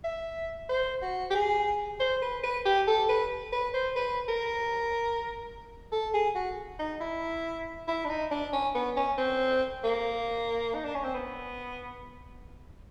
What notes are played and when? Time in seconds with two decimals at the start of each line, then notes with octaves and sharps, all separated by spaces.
0.04 E5
0.69 C5
1.02 F#4
1.30 G4
1.35 G#4
2.00 C5
2.22 B4
2.43 B4
2.65 G4
2.87 A4
3.09 B4
3.52 B4
3.74 C5
3.96 B4
4.28 A#4
5.92 A4
6.14 G#4
6.35 F#4
6.79 D#4
7.01 E4
7.87 E4
8.05 D4
8.09 D#4
8.31 D4
8.53 C#4
8.75 B3
8.97 C#4
9.18 C4
9.84 A#3
10.75 D#4
10.84 D4
10.94 C#4
11.04 C4
11.14 B3